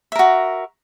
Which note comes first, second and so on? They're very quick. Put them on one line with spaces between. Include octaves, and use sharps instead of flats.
E5 A#4 F#4